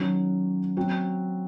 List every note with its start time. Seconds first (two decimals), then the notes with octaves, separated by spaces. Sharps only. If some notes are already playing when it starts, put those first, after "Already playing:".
Already playing: D#3 F#3 C#4 F#4
0.77 F#3 C4 F#4